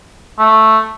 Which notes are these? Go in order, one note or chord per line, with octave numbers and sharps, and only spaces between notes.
A3